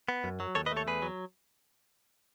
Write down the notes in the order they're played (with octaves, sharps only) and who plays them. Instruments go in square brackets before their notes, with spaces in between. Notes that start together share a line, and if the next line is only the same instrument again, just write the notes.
[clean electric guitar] B3
F#2
F#3
D#2 A4 C#5
B4 D#5
A3
A4 C#5
E2 G#4 B4
F#3